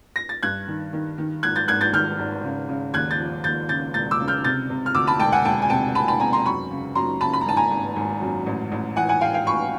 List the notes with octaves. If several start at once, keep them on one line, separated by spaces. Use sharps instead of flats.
A#6
A6
G2 F#6 G#6
D#3
D#3
D#3
G#1 F#6 G#6
G6 A6
G#1 F#6 G#6
G6 A6
D#3 F6 G6
G#1
C#3
C#3
D#2 F#6 G#6
G6 A6
F3
D#2 G6 A6
C#3 G6 A6
E1 G6 A6
D6 E6
C#3
F6 G6
C3 G6 A6
C3
F6
D2 D6 E6
A5 B5
E1 G5 A5
F#5 G#5
E1 G5 A5
G#5
C3 G5 A5
C3 A5 B5
A5 B5
C3 G#5 A#5
A#5 C6
F#2 B5 C#6
C#3
F#2 A#5 C6
C#3 A5 B5
B5
A#5
G#1 A5
G#5 A#5
G#1
G#1
F#2
A1
A1
E3 F#5 G#5
F#5 G#5
A2 F5 G5
F5 G5
A1 B5 C#6